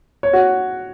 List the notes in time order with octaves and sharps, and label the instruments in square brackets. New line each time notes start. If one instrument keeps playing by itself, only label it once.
[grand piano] C#5
F#4